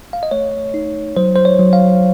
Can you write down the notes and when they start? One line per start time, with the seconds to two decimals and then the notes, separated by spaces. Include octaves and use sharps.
0.13 F5
0.23 D#5
0.31 A3 C#5
0.74 D#4
1.17 F#3 C5
1.36 C5
1.45 C#5
1.59 F#3
1.73 F5